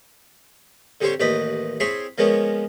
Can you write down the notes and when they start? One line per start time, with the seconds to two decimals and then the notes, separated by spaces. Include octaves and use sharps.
1.01 D3 G3 C4 G4 C5 C#5
1.20 A1 D#2 B4 D5 D#5 B5
1.80 C4 E4 G#4 C#5 B5 C6
2.18 F3 G#3 A#3 B3 C#4